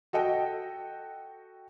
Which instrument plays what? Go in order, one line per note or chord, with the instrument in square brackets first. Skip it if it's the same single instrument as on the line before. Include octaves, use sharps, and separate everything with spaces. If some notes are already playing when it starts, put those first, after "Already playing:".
[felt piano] F#4 A4 D#5 G5